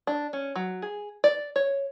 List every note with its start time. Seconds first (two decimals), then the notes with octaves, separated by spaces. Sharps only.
0.07 D4
0.33 C#4
0.56 F#3
0.82 G#4
1.24 D5
1.56 C#5